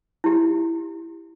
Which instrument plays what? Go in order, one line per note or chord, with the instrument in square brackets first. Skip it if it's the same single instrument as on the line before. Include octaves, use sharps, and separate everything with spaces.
[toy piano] E4 G4